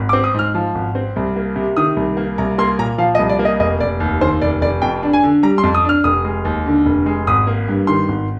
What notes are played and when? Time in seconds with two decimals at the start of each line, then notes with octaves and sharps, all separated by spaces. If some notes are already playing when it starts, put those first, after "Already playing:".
Already playing: G#1
0.09 D6
0.13 C4
0.24 D#6
0.34 G#2 F6
0.55 F3
0.75 G#1
0.95 C4
1.16 C2
1.36 A#3
1.56 C3
1.77 D#3 D#6
1.96 C2
2.17 A#3
2.38 C2 A#5
2.58 A#3 C6
2.79 A#2 A#5
2.98 F3 F5
3.15 D#5
3.19 C2
3.29 D5
3.39 A#3
3.45 D#5
3.60 F1 D#5
3.80 F1 D5
4.00 D#2
4.21 D#3 C5
4.41 F1 D5
4.61 F1 D5
4.82 F2 G5
5.03 D4
5.13 G#5
5.24 D3
5.43 G3 A#5
5.58 C6
5.63 F2
5.75 D#6
5.85 D4 F6
6.04 F1 D#6
6.25 G#3
6.45 D#2
6.66 D3
6.86 F1
7.06 G#3
7.27 G#1 D#6
7.47 A#3
7.68 G2
7.87 D#3 C6
8.08 G#1